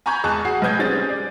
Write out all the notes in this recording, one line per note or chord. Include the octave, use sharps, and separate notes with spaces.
G#5 A#5 B5 C#6 G6 G#6
E2 G#3 G#5 A5 C#6 F#6
F#4 G#4 C7
B1 B4 D#6 G6 G#6
G3 C4 C#4 G#4 A6
D5